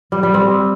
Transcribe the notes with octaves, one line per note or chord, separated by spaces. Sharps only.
G3
G3
C4